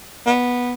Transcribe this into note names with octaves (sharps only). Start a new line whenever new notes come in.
B3